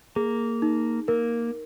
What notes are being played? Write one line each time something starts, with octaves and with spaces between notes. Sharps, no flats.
A#3 G#4
D#4
A#3 A#4